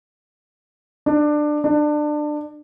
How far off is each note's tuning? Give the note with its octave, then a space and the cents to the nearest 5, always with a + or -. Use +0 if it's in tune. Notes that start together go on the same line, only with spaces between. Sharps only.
D4 +20
D4 +25